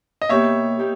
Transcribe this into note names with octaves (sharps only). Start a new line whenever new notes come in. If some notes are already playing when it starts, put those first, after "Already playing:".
D#5
B2 A#3 D#4 G4 C#5 E5
A#3 D#4 G4